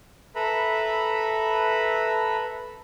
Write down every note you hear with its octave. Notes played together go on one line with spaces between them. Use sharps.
A4 B4 E5 A#5 B5